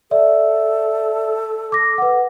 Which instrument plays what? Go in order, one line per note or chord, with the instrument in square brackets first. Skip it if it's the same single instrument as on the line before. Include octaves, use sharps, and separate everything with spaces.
[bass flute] A4 [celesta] D5 E5
[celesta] D6 A#6
B4 F#5